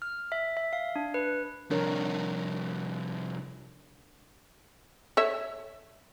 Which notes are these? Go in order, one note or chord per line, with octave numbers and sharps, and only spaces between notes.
F6
E5
E5
F5
D4
B4
C2 F2 D4 A#4 C#5
A4 C#5 E5